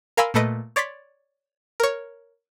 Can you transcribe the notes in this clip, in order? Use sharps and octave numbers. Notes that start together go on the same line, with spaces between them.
A#4 F5 G#5 B5 C6 E6
A#2 A3 A4 B4 D#5 D7
C#5 D5 C6 A6 B6
A#4 C#5